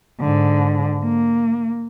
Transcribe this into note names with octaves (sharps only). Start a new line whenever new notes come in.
G#2 D3
A#3